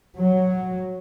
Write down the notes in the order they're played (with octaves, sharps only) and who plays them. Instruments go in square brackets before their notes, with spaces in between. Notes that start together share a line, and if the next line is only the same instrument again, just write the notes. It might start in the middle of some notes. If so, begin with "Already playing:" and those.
[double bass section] F#3